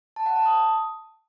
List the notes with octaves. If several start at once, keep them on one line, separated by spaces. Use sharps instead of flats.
A5
F#5
A5
D#6